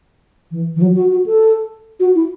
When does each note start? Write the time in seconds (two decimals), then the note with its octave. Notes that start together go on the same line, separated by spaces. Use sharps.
0.51 E3
0.76 E3
0.82 F#3
0.96 F#4
1.11 F#4
1.26 A4
2.00 F#4
2.15 E4